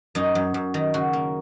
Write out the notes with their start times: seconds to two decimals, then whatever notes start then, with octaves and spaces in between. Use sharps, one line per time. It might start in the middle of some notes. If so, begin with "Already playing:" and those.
0.15 F#2 D#4
0.35 F#2
0.54 F#2
0.74 D#3
0.94 C#3 F#4
1.13 A#3